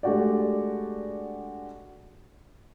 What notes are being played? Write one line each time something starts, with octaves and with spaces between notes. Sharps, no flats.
G#3 A3 D4 F#4 G4 D5